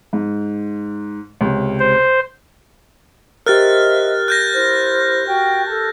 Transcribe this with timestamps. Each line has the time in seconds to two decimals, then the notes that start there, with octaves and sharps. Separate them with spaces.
0.13 G#2
1.41 C#2 C3
1.79 C5
3.46 G4 A#4 C5 D#5 E5 F6 F#6 A6
4.28 F#6 G6 A#6
4.54 E4 C5
5.27 F#4 G5
5.67 A4 A5